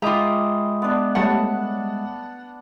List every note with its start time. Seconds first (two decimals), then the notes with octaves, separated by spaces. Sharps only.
0.02 G#3 F4 E5 G5 A#5 B5 D6 D#6
0.82 B3 D4
1.15 G3 A3 C#5 F#5 A5 B5